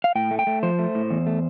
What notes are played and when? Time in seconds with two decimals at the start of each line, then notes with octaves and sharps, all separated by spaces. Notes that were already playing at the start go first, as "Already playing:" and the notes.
0.04 F5
0.15 A2 G5
0.31 A3
0.39 G5
0.47 A3
0.63 F3 C5
0.79 A3
0.95 A2
1.10 E2
1.26 A3